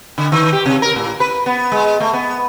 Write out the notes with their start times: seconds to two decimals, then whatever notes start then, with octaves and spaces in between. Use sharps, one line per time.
0.18 D3
0.32 D#3
0.53 G4
0.66 C3
0.82 A#4
0.96 A2
1.20 B4
1.46 B3
1.72 G#3
2.00 A3
2.13 B3